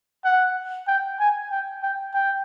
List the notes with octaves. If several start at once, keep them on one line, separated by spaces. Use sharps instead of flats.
F#5
G5
G#5
G5
G5
G5